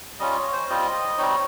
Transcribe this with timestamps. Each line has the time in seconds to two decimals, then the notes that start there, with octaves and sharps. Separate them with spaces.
0.20 G3 C#4 F4 D#5
0.37 C#5
0.52 C5
0.70 G3 C4 F4 D#5
1.18 G3 C4 D#4 C#5